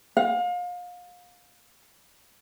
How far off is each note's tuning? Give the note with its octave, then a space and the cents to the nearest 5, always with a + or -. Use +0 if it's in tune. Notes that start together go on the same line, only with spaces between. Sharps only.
F5 +30